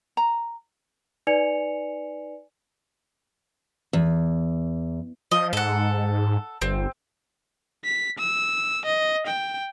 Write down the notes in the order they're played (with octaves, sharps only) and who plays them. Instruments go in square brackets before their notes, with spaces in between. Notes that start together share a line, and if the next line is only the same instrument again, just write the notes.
[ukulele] A#5
[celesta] D#4 B4 D5 G#5 C#7 F7
[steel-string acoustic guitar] E2
[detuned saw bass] F3 [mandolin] D#5
[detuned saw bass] G#2 [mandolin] A4 F#5
[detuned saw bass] G1 [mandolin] C4
[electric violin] B6
E6
D#5
G5